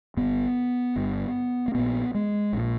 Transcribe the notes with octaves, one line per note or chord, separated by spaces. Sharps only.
G1 G2 B3
G1 G2
A#3
A#1 A#2 B3
G#3
A#1 A#2